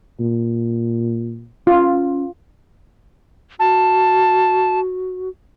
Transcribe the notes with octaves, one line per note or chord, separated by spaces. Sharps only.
A#2
C#4 F4
F#4 A5